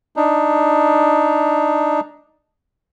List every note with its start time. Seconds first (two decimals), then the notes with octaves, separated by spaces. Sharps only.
0.16 D4 D#4